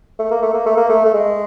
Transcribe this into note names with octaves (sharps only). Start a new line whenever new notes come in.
A3
A#3
A3
A#3
A3
A#3
A3
A3
G#3